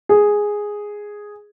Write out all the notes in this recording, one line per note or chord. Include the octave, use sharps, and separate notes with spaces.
G#4